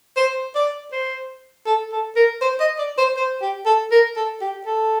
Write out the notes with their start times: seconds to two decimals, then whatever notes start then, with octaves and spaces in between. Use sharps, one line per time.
0.17 C5
0.55 D5
0.92 C5
1.66 A4
1.92 A4
2.16 A#4
2.41 C5
2.60 D#5
2.78 D5
2.98 C5
3.16 C5
3.42 G4
3.66 A4
3.91 A#4
4.16 A4
4.41 G4
4.66 A4